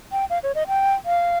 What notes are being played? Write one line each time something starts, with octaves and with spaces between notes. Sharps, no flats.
G5
F5
C#5
D#5
G5
F5